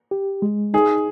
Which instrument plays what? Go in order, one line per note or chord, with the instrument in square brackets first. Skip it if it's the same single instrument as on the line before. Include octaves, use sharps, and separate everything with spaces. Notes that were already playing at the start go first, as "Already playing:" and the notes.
[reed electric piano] G4
G#3
[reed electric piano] D#4 [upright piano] G#4